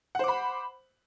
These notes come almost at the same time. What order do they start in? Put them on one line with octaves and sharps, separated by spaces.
F#5 C5 D6 B5